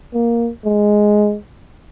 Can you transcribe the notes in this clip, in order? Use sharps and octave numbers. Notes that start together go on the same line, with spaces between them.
A#3
G#3